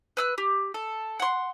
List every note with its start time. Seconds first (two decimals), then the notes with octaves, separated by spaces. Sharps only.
0.17 B4 E6 F#6
0.38 G4
0.74 A4
1.20 F#5 C6